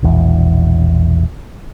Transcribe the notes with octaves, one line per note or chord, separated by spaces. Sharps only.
E1 A#1 E2